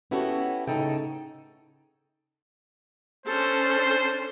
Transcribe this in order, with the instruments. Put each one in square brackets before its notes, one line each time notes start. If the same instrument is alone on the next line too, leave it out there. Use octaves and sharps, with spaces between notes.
[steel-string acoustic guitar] B3 C#4 E4 F#4 G4 A4
A2 C#3 D#4 A4 G5
[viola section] C#4 D4 A4 [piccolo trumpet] C5